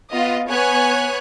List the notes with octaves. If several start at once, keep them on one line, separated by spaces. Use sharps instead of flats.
B3 F4 D#5
B3 C#5 G#5 F#6